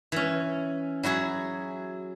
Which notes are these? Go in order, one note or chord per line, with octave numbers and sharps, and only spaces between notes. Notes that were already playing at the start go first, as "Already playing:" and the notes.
E3 C#4
F#3 E4 F#4 G#4